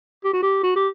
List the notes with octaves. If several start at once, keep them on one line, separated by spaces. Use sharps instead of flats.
G4
F#4
G4
F#4
G4